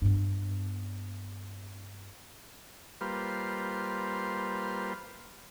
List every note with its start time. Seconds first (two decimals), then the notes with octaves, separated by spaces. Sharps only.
0.02 G2 B3
3.01 G3 A#3 F4 B4 C5